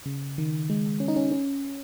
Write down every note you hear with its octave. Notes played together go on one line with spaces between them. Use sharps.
C#3
D#3
G#3
C#4
D#4
C#4
C#4